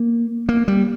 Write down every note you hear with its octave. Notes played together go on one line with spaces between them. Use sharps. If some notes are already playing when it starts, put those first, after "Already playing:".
Already playing: A#3
A#3
G3